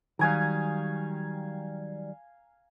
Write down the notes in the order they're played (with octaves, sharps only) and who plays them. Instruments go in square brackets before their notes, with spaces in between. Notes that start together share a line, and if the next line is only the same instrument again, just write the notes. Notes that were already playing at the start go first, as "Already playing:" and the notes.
[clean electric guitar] D#3 F#3 G3 [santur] F5 G#5 A#5